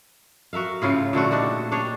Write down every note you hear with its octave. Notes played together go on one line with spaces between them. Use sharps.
F#4 A#4 E5 F5
A2 C#3 F4 G#4
A#2 D3 A3 F#4
D4 D#4 F#4 G4
D4 G4 G#4 C#5